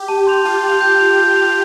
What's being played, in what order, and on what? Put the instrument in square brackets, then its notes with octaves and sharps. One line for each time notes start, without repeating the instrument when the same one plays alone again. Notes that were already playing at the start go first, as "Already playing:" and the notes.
Already playing: [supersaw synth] G4
[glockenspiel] A5
C6 G6 F7
[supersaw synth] F4 [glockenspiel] A5
[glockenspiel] C6 G6 F7
G6
F7
G6
F7